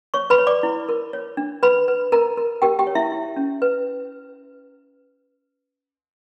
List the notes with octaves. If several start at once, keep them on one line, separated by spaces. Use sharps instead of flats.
C#5 C#6
B4 B5
C#5
D5 D6
E4
A#4
C#5
D4
B4 B5
B4
A#4 A#5
A#4
G4 A#4 G5
G4 G5
C#5
E4 E5
E4
C#4
B4